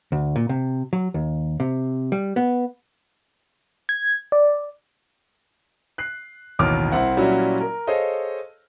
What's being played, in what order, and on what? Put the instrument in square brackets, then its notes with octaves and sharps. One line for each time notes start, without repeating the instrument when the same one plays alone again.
[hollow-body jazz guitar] D2
A#2
C3
F#3
D#2
C3
G3
B3
[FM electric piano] G#6
D5
[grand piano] F#6 C7
A1 D#2 B2 C#5 D6 F6
C2 C4 E4 C5 F#5
A#2 F#3 G3 C#4 E4 F#4
A#4
G#4 A4 C5 C#5 D#5 F5